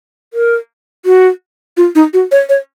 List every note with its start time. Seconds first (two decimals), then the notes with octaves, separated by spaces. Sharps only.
0.34 A#4
1.05 F#4
1.77 F4
1.95 D#4
2.13 F#4
2.32 C#5
2.49 C#5